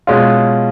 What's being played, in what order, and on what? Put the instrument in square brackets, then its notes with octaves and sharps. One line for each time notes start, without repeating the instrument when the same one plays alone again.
[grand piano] B2 G#3 C#4 F4